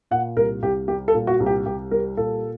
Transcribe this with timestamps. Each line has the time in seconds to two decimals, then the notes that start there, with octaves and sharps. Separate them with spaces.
0.11 A#2 F#5
0.36 C2 A#4
0.62 C2 G4
0.88 G3 G4
1.08 A4
1.14 A#2
1.27 F#4
1.40 C2
1.46 G4
1.66 C2 G4
1.91 G3 A#4
2.17 A#2 A4